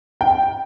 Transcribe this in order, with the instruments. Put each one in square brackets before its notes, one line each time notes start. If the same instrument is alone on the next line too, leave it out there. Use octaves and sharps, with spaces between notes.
[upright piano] G5